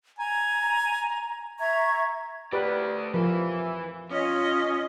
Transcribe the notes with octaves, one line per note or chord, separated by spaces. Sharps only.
G#5 A#5
E5 A#5 C#6 G#6
A3 G4 B4 D5
E3 F3 A#4 B4
C#4 F4 D#5